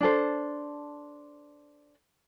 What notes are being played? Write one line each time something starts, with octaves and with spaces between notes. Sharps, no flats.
D4 A4 C5